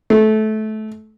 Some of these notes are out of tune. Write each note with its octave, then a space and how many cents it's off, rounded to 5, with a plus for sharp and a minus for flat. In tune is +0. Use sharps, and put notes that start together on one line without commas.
A3 -20